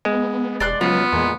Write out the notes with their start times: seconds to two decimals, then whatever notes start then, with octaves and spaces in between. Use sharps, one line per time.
0.05 G#3 B3
0.60 E1 D5 C6 F#6
0.81 C#2 F3 F#3 B3 F4
1.13 E2 A#2 G#3